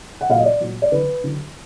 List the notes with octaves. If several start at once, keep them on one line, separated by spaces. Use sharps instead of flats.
F#5
A#2 F#3 F5
D#5
D5
A#2 F#3
D5
D3 F#3 B4
D3 F#3